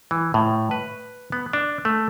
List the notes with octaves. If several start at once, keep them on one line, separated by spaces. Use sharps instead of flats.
E3
A2
B4
B3
D4
A3